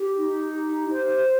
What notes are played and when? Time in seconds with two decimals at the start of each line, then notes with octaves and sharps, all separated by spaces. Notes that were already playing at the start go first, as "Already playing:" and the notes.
Already playing: G4
0.16 D#4
0.53 G4
0.90 C5